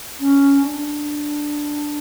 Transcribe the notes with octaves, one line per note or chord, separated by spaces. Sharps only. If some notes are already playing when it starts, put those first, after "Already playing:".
C#4
D4